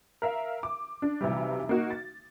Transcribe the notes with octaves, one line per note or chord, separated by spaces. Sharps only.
A#4 E5 F5
D6
D4
B1 C3 E3 G3
A#3 D#4 F#4
A6